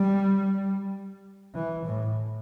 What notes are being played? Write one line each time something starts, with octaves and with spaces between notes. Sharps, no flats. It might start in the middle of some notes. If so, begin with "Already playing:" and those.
Already playing: G3
E3
A2